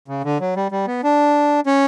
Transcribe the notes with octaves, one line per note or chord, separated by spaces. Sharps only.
C#3
D3
F#3
G3
G3
B3
D4
C#4